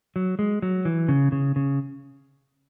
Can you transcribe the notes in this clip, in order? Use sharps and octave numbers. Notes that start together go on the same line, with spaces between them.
F#3
G#3
F#3
E3
C#3
C#3
C#3